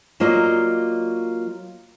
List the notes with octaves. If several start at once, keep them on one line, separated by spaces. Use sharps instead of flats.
F#3 A#3 F4 D5 D#5